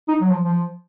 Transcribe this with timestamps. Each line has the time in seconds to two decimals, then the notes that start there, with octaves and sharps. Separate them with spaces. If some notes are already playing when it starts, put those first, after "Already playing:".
0.08 D#4
0.21 F#3
0.30 F3
0.41 F3